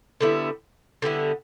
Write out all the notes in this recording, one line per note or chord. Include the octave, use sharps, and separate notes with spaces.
D3 G3 B3 E4
D3 G3 B3 E4